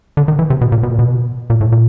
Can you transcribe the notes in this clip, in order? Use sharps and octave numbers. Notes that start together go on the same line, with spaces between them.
D3
D#3
E3
C3
B2
A#2
B2
A#2
B2
A#2
A2
A#2